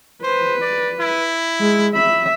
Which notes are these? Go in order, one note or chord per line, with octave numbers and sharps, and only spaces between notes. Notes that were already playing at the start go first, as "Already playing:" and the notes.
B4 C5
D5
E4
G#3
E5 B5